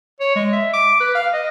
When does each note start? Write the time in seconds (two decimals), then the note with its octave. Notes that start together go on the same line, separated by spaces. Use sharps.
0.20 C#5
0.36 G#3
0.53 E5
0.73 D6
1.00 B4
1.15 F5
1.33 D#5